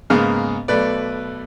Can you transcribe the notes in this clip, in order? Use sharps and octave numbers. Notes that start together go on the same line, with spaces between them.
G#2 C#3 A#3 B3 G#4 F6
B1 A3 B4 D5